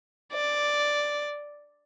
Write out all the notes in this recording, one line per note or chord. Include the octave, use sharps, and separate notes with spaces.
D5